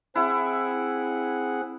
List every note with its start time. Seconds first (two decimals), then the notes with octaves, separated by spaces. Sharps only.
0.16 C4 E4 G#4 F#5